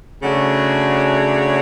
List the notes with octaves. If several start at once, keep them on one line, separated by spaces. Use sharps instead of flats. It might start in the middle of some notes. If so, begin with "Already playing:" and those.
C#3 F#3 A3 D4 F#4